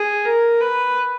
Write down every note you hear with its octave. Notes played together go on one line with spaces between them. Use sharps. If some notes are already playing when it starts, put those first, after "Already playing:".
Already playing: G#4
A#4
B4